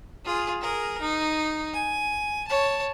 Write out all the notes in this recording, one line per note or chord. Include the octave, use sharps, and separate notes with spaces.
F4 G#4
G#4 A#4
D#4
G#5
C#5 A5